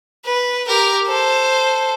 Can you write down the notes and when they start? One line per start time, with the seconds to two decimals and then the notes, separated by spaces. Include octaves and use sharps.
0.25 B4
0.67 G4 A#4
1.08 A4 C5